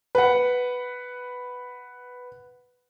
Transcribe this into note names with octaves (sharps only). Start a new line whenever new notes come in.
B4 F#5